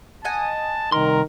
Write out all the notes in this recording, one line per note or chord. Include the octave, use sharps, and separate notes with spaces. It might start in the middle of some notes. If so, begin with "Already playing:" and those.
D#5 F#5 G#5 A5
C2 D#3 A#4 C6